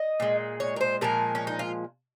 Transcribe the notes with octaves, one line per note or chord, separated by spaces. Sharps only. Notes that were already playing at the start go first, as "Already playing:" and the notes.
Already playing: D#5
A#2 G#3
C#5
A#4
C5
A#2 F3 G#3 A#4
C#4
D#4
F4